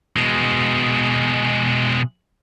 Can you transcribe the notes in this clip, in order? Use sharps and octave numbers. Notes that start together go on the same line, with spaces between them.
B2 G#3